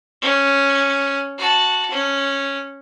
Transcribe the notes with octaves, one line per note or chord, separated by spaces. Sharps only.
C#4
F#4 A5
C#4